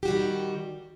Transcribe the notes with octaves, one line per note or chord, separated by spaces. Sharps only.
D#3 G3 F#4 G4